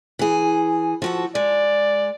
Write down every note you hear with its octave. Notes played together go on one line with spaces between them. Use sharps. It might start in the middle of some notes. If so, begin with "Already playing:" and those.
E3 G#4
F3 F#4 A4
G#3 D5